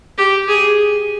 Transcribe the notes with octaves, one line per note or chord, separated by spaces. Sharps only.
G4
G#4